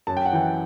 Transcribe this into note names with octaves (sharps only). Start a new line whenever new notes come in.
F#2 A5
G5
F#5
E3 G5